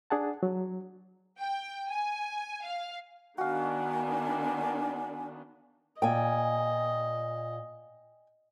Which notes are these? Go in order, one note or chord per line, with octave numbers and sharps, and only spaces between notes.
D4 G#4 F#5 A5
F#3
G5
G#5
F5
D#3 B3 D4 F#4 F5 G#5
A#2 D#5 G5 G#5